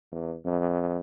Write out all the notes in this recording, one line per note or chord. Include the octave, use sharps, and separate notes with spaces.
E2
F2